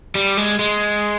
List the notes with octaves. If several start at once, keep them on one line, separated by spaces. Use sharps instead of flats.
G3
G#3
G#3